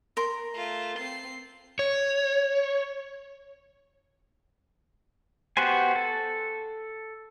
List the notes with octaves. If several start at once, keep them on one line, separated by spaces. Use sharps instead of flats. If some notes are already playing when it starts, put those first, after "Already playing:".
A#4 C6
A3 F4
C4 C7
C#5
B3 F#4 G4 C5 G#5
A4